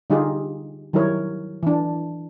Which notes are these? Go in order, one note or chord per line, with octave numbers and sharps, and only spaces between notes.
D3 G3 D#4 F4 G4 G#4
D#3 F#3 G3 E4 A#4 C#5
E3 D4